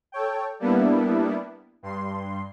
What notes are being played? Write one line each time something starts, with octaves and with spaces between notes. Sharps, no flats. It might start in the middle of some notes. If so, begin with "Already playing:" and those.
A4 C#5 G5
G3 A#3 B3 D4 E4
G2 C6